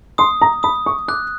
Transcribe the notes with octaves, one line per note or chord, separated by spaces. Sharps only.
C6 D#6
A#5
B5 D#6
C#6
D6 F#6